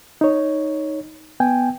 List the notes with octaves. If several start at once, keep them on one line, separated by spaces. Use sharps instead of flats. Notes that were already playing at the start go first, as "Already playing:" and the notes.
D#4 C#5
B3 G5 G#5